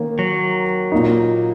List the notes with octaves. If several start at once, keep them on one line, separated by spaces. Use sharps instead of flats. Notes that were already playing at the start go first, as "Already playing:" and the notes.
Already playing: D#3 A#3 C#4
F#3
A#2 A#3 D#4